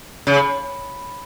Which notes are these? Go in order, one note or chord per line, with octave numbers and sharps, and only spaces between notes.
C#3